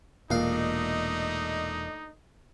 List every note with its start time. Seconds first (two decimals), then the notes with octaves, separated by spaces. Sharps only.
0.31 E1 A#2 A3 D4 D#4 D#5 F5